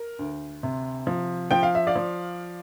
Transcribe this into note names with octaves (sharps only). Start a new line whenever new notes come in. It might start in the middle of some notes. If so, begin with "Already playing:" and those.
Already playing: A#4
D2
C3
F3
F3 G5
F5
E5
D5 F5
F3